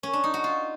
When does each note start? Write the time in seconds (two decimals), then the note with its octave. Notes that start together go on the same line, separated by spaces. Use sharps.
0.03 C#4
0.13 D4
0.24 D#4
0.34 F#4
0.44 F4